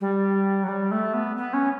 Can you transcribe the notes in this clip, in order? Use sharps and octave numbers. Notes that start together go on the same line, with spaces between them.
G3
F#3
G3
A3
B3
B3
C#4